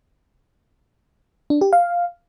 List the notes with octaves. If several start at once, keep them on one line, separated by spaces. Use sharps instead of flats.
D4
G4
F5